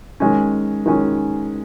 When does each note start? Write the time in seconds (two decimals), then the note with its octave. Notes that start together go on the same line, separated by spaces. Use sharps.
0.20 D#3 G#3 C#4
0.86 D#3 G#3 C#4